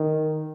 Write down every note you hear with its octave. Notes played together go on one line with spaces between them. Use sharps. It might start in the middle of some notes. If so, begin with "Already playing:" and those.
Already playing: D#3